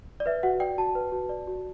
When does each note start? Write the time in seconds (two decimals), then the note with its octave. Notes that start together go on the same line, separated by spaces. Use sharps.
0.20 D5
0.26 B4 E5
0.43 F#4 F#5
0.60 D5 G5
0.78 F#4 A5
0.95 B4
1.12 F#4
1.29 D5
1.47 F#4